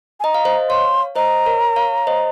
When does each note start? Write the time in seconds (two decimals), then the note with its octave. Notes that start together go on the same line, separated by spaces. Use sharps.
0.20 G#5
0.24 D#5 A#5
0.34 F5
0.45 C5 D#5
0.70 C#5 F5 C6
1.16 C5 D#5 A#5
1.46 A#4 C#5
1.76 C#5 F5
2.07 C5 D#5